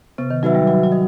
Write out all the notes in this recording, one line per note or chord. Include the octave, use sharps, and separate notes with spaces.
C3 B3
D#3
F#3 D#4 F#4 B4 E5
G3
F#3 F#4
F#3
D#5